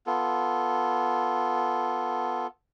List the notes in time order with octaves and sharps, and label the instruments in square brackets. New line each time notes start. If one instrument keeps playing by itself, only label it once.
[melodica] B3 F4 A4